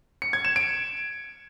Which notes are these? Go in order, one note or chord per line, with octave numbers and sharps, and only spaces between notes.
C#7
G#6
E7
D7